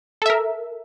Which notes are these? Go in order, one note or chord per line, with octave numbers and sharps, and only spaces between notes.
A4 A#4 E5